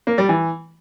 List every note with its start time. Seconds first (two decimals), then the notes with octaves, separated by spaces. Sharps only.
0.07 A#3
0.18 G3
0.29 E3